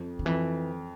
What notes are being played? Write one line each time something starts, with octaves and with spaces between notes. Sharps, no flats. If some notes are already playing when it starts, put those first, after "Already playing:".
Already playing: F2
D3
F2 E3